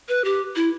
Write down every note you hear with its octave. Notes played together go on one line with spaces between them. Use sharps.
B4
G4
E4